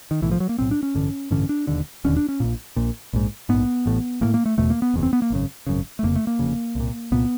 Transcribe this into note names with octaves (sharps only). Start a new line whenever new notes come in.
D#3
B1 A2 E3
F3
F#3
A#3
B1 A2 C4
D4
C#4
A1 G2 D3
A1 G2 D3 C#4
D4
E1 D#2 D3
E1 D#2 D3 C#4
D4
C#4
A#1 A#2
A#1 A#2
A#1 G#2
A#1 G#2 B3
A1 A2
A1 A2 A#3
A#3
A3
F#1 E2 B2 A3
A#3
B3
F#1 E2 B2
C4
B3
A#3
G#1 F#2 C#3
G#1 F#2 C#3
A3
F1 F2 C#3 A#3
A3
A#3
F1 F2 C#3
C2 A#2
C2 A#2 B3